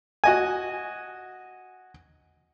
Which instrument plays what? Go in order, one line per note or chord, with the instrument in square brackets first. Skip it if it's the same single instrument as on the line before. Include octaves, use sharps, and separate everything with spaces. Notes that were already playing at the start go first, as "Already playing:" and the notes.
[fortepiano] F#4 D#5 G#5